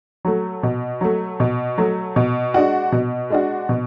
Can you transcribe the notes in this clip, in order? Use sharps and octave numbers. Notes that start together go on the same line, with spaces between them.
F#3 A3
B2
F#3 A3
B2
F#3 A3
B2
G#3 D4 F#4
B2
G#3 D4 F#4
B2